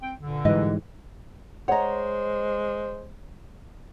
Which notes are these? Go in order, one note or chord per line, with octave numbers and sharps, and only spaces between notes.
C4 G5
G2 A#2 D3
G#2 E3 G3 B4 D#5
G#3 C5 C#5 D#5 F#5 A#5